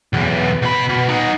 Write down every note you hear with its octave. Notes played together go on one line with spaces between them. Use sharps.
B1 E2
B2 B5
B2
D#4 F#5